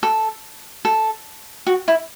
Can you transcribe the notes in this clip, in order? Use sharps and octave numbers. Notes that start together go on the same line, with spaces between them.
A4
A4
F#4
E4